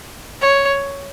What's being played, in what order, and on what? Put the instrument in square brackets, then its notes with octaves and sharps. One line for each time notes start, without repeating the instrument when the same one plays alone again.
[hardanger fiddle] C#5